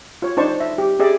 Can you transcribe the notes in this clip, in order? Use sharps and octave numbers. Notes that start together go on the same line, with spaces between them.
F4 C#5
D4 D#4 C5 A5 C#6
E5
G4
G4 G#4 D5 E5